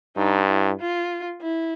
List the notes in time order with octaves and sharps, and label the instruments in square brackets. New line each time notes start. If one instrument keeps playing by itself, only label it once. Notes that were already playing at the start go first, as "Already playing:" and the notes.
[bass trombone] G2 [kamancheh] D#4
[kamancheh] E4
F4
E4